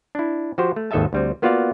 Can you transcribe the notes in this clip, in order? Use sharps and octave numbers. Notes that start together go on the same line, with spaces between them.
D4 E4
F3 F#4 G4 C5
A3
G#1 D#2 A4 D#5 E5 A5
D2 G3 C4
A#3 B3 F4 F#4 D5 F5